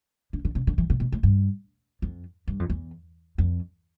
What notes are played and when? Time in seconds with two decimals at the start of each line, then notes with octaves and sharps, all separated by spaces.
0.33 D3
0.45 D3
0.55 C3
0.67 D3
0.78 E3
0.90 C3
1.00 B2
1.12 A2
1.23 G2
2.02 F2
2.48 G2
2.60 F2
2.70 E2
3.38 F2